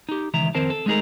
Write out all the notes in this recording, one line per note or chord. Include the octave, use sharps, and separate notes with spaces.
D#4 G4
C#2 D#3 E3 E5 A#5
F2 D#3 C4 A#4 C5 A5
A4
G#3 A3 D#4 G#4 A#4